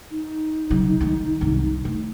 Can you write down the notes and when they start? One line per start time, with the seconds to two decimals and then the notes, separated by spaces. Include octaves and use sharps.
0.11 D#4
0.70 C#3 F#3
1.01 D#3 G#3
1.41 C2 F#2
1.85 A3